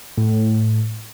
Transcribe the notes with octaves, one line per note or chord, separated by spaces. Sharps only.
A2